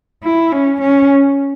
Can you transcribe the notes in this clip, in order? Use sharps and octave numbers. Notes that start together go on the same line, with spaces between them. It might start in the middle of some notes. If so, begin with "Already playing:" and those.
E4
C#4
C#4